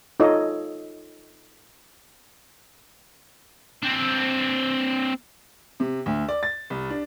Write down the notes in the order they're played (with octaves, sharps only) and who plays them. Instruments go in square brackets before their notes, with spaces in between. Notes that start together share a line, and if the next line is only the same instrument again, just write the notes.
[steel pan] D#4 F4 A4 C#5 D#5 F5
[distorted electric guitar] C4 D4
[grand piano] C3
D2
D5
A6
C2
D4